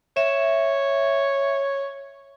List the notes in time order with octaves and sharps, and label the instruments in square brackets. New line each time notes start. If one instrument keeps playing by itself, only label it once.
[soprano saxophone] C#5 [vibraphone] E5